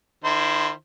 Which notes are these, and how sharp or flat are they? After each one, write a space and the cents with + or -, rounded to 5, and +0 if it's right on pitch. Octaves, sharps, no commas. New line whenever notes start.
D#3 -35 E4 +20 C5 +0